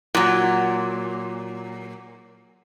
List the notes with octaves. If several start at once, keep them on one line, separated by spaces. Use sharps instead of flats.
A#2 F#3